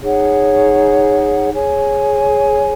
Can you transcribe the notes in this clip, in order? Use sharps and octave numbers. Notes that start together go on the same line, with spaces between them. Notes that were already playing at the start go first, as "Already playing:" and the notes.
D#4 G#4 C#5 F#5
G#4 C#5 G#5